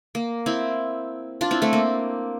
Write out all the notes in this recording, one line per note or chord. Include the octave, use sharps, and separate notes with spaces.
A#3
C4 E4
D4 F4
C4 E4
A3 C4
A#3